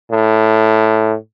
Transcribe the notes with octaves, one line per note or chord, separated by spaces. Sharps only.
A2